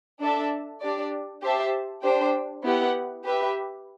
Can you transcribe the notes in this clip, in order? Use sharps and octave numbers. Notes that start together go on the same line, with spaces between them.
D4 A4 E5 A5
D4 G4 D5
G4 C5 E5 A5
D4 G4 C5 G5
B3 E4 G4 B4 F#5
G4 B4 E5